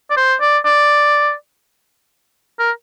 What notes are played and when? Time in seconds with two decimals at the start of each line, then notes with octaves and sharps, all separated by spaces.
0.10 D5
0.17 C5
0.41 D5
0.65 D5
2.59 A#4